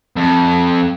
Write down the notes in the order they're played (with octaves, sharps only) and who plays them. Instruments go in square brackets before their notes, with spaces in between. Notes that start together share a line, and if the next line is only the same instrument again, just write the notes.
[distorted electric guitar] F2